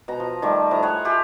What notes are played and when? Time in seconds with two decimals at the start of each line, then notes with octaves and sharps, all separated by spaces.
0.08 B2 A#5
0.20 F3
0.42 D#3 G3 A3
0.71 A2 F3 A#5
0.82 G#4 C#5 F#5
1.05 F4 G4 G#4 E5